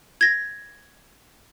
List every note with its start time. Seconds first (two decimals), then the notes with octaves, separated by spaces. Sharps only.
0.21 G#6 A#6